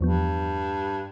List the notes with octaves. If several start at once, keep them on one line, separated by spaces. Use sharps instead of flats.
E2 G2 F3 B3